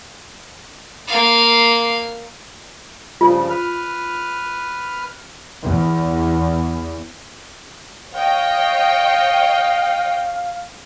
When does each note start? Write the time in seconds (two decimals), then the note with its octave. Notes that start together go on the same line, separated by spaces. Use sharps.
1.08 A#3 F5
3.21 G2 C#3 F3 F4
3.50 B4 F6
5.64 E2
8.14 C#5 D#5 F5 G5